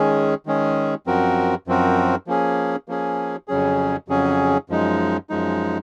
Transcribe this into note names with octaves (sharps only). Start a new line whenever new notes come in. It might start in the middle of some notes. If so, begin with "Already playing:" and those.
Already playing: D#3 G#3 C#4 G#4
D#3 G#3 C#4 G#4
F#2 F3 C4 F#4 A#4
F#2 F3 C4 F#4 A#4
F3 A#3 C#4 G#4
F3 A#3 C#4 G#4
F2 C#3 F#3 C#4 G#4
F2 C#3 F#3 C#4 G#4
F#2 F3 G#3 D#4
F#2 F3 G#3 D#4